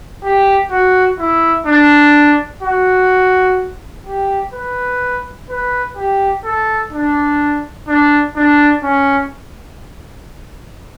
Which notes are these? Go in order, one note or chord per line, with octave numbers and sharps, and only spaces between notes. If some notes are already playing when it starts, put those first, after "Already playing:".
G4
F#4
E4
D4
F#4
G4
B4
B4
G4
A4
D4
D4
D4
C#4